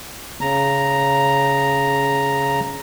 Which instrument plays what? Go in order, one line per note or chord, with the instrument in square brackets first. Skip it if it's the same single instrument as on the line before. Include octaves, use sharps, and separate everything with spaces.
[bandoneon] C#3 A#5